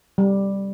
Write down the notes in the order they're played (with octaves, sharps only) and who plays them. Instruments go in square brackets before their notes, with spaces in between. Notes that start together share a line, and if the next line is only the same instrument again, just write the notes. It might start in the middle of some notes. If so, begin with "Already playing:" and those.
[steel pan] G3